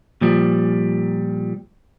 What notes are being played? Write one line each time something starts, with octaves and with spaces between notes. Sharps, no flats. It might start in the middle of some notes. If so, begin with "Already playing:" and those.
A#2 F3 G3